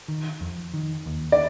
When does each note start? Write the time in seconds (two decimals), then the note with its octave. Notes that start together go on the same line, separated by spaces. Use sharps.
0.08 D#3
0.41 F2
0.74 D#3
1.06 D#2
1.32 D5